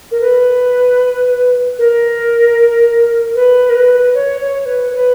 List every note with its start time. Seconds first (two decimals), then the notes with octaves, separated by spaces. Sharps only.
0.11 A#4
0.20 B4
1.78 A#4
3.35 B4
3.69 A#4
3.74 B4
4.14 C#5
4.40 C#5
4.65 B4
4.93 B4